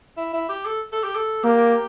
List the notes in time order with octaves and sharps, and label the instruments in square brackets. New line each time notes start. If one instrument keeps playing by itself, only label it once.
[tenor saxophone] E4
E4
G4
A4
A4
G4
A4
[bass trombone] A#3 [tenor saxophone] G4